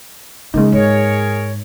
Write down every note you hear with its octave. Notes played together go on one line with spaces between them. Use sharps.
C#3 G#3 A#3 D#4
G#2 G#4 A#4 C#5